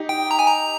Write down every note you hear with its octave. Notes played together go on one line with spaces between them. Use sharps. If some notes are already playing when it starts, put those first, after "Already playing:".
Already playing: D#4 G4
G5
A#5
G#5
A#5